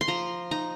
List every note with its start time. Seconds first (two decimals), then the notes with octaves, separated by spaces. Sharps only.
0.01 C6
0.08 F3 A#5
0.51 D#4 A#5